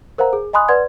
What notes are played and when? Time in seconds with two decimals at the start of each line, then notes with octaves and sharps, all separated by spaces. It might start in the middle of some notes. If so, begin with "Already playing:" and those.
0.18 A#4 C5 F5 F#5 A#5
0.33 G#4
0.53 D#5 G#5 B5 C6 D#6 F#6
0.69 B4 D5 F#5 C6 G#6